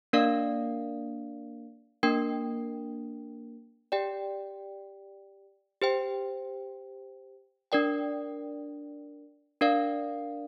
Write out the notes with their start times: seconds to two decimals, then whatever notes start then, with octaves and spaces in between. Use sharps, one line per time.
0.13 A#3 D4 A#4 D5 F5
2.03 A#3 D4 A#4 G5
3.92 G4 D5 G5
5.82 G4 C5 G5
7.72 D4 A#4 D5 G5
9.61 D4 A#4 D5 F5